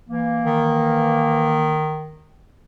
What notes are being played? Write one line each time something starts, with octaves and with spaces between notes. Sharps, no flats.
E3 A#3
D#3